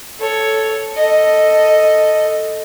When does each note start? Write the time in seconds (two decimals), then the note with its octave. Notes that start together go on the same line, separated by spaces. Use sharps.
0.19 A4 C#5
0.97 A4 D#5